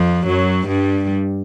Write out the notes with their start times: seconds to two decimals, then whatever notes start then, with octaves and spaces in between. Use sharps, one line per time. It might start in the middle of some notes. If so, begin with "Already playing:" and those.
Already playing: F2 F3
0.27 F#2 F#3
0.67 G2 G3